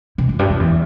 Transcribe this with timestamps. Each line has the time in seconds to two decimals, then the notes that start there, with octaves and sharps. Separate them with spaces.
0.18 B2
0.29 F#2
0.39 G2
0.50 F#2
0.60 E2